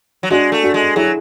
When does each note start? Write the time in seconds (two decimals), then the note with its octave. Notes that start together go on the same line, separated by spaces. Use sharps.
0.23 F#3
0.30 G#3 D4 F#4
0.52 A3
0.63 D4 F#4
0.74 G#3
0.96 F#3 E4 G#4